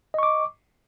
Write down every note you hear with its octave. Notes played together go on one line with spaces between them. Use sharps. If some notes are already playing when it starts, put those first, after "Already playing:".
D#5 C#6 D6